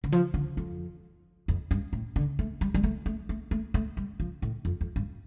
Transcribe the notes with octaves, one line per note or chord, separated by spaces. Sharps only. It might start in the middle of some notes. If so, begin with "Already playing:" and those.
D3
F3
D3
F2
F2
G2
A2
D3
A3
G3
G3
A3
A3
A3
A3
A3
G3
F3
A2
F2
F2
G2